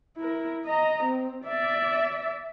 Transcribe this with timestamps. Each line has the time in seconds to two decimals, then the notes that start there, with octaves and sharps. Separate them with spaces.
0.17 E4 A#4
0.66 D#5 A#5
1.04 C4
1.46 D5 E5